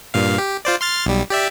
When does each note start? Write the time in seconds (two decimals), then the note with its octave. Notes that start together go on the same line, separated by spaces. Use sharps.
0.14 G2 A#2 F5
0.38 G4
0.65 F4 C5 D5
0.81 C6 F6 A6
1.06 B1 G3
1.30 G4 D5 E5